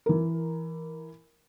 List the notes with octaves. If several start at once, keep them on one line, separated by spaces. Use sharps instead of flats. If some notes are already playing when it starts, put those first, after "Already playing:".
E3 A#4